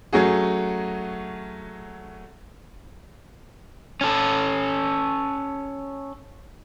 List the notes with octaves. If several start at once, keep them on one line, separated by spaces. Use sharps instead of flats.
F#3 A3 C#4 F#4 G#4
C#4 A4